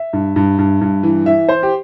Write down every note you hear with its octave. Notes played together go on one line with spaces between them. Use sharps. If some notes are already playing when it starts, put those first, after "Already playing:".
Already playing: E5
G2
G2
G2
G2
E3
E3 E5
E3 C5
G4